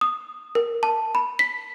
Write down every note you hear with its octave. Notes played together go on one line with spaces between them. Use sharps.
D#6
A#4
A5
B5
B6